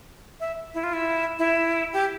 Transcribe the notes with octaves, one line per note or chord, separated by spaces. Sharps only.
E5
E4
F4
E4
E4
G4